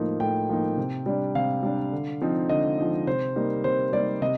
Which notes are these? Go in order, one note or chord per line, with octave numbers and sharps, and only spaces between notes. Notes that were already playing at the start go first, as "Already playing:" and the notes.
Already playing: A2 F3 A#3 D#4
A2 G5
F3 A#3 D#4
C3
G3 D4
C3 F5
G3 D4
D3
F3 C4 D#4
D3 D#5
F3 C4 D#4
C3 C5
G3 A#3 D#4
C3 C5
G3 A#3 D#4 D5
C3 D#5